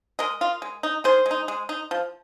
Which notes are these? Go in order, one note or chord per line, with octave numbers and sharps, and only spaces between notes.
G#3 A#4 D#5
F4
G#3
D#4
D#3 G#4 C5
G#3
D#4
G#3
D#4
F3